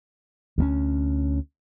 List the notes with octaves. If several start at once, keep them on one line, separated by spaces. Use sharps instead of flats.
D2 A3 C#4